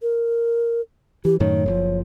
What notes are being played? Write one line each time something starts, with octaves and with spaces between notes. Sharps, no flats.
A#4
E3 G4
F#2 A2 D#3 C#5
F#1 A#2 F3